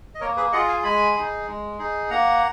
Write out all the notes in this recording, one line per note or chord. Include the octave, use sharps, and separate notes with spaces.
D#5
A#3 A#4 C#5
G#4 B4
F4 G#4 D#5 F#5
F5 G#5
G#3 G#5 B5
D#4 G#4
G#3
D#4 G#4
A#3 F#5 A#5